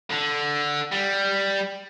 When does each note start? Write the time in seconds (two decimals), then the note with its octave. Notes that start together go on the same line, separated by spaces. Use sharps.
0.11 D3
0.92 G3